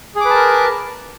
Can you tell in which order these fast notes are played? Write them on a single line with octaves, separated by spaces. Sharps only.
G#4 D6 B4 A5 A#4